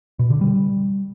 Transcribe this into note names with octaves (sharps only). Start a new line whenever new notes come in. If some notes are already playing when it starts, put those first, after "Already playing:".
B2
D3
G3